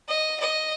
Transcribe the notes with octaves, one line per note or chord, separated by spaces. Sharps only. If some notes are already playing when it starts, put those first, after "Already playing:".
D#5
D#5